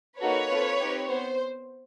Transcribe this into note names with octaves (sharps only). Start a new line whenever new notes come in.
A#3 D#4 F#4 A4 B4 C#5
C4 F4 A4
C4 D#4 G4
B3 C5